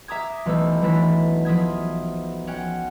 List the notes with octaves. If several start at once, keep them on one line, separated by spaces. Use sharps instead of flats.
E5 A#5 D6 D#6 G#6
B1 E3 A3 C5 E6
E3 F#3 A3 D4 E4 E5
F3 E5 D#6 G#6
C#4 F#5 G5